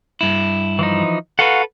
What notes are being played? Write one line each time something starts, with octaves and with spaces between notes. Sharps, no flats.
G2 E4
E3 F3 D#4
F#4 A4 B4 F5 F#5